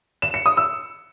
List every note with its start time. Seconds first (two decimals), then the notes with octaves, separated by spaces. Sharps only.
0.22 E7
0.34 C#7
0.46 D#6
0.57 E6